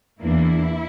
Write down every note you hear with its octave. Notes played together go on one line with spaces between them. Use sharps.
E2 E3 A#3 D4 E4